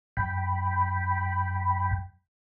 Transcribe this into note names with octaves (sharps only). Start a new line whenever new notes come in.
F#2 G5 B5